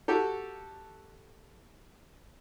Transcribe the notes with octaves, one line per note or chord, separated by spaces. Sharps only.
F#4 G4 A4